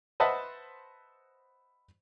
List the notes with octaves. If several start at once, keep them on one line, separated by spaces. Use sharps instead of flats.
B4 C5 D#5 E5 F#5 A5